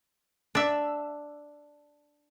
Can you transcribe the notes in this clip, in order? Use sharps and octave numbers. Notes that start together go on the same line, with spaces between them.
D4 E5